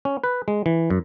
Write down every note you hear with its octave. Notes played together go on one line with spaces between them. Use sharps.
C#4
B4
G#3
E3
F#2